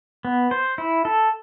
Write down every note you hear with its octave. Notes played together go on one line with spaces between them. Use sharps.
B3
C5
E4
A4